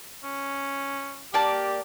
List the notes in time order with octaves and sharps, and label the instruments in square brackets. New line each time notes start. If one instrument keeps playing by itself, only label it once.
[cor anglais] C#4
[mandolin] A#3 D5 A5 [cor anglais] G4